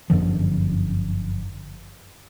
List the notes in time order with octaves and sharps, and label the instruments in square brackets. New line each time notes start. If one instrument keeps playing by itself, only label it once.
[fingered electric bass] G1 F#2 D3 F3